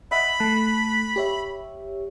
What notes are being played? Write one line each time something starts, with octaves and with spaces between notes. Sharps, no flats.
D#5 E5 F#5 B5
A3 A5 F#6
G4 C#5 E5